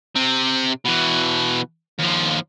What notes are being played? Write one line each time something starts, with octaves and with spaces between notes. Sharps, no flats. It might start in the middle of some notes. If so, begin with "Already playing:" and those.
C3 C4
B2 E3
D#2 F3